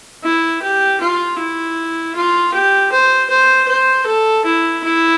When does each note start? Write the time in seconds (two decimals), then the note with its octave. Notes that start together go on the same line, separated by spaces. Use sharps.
0.24 E4
0.63 G4
1.01 F4
1.38 E4
2.16 F4
2.54 G4
2.92 C5
3.30 C5
3.68 C5
4.06 A4
4.45 E4
4.84 E4